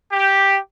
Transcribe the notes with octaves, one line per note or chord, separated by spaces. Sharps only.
G4